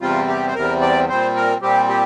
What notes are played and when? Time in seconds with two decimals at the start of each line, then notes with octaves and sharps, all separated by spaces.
0.01 E2 C3 G3 C4 F4
0.28 G4
0.47 C5
0.55 E2 C3 G3 C4 A#4
0.81 D5
1.09 A#2 G3 C4 C5
1.36 A#4
1.61 A#2 G3 C4 G4
1.89 G4